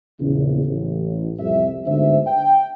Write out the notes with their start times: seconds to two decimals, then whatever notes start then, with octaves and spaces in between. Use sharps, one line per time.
0.20 A#1 E2 C#3
0.66 A1
1.40 C2 F2 E5
1.87 G1 D2 G#2 D3 C5 E5
2.27 G5